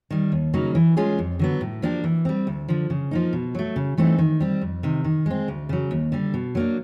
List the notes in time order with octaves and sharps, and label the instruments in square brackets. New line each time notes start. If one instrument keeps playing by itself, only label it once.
[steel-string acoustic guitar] D#3 G3
D#2
C#3 F#3 A#3 D#4
E3
G#3 C#4 F4 G#4
F2
D3 F#3 B3
A2
F3 A#3 D4 G4
E3
G3 C4
D2
D3 F3
C#3
F3 A#3 D#4
B2
F#3 A3
C#3
E3 A3 C4 D#4
D#3
G3 C4
F2
C3 D#3
D#3
G#3 C4
D2
C#3 F#3
D#2
D3 G3
B2
F#3 A#3 D4